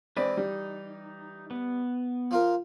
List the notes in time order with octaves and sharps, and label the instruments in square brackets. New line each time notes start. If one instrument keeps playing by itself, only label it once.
[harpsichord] E3 [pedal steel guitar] G#3 B4 [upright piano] C4 D5
[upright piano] G3 [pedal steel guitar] D#4
[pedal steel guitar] B3
[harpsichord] F3 F4 A#4